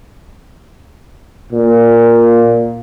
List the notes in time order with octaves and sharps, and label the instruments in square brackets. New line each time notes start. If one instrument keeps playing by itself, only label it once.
[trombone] A#2